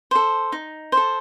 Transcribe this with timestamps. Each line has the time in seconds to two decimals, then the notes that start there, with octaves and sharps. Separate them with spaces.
0.11 A4 C5
0.52 D#4
0.92 A4 C5